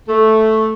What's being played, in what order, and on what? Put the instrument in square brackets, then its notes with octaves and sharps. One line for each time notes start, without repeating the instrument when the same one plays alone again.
[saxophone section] A3